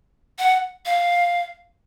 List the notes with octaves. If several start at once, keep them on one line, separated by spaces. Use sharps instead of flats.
F#5
F5